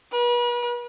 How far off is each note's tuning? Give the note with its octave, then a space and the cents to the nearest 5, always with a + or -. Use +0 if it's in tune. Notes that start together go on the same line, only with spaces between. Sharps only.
B4 -40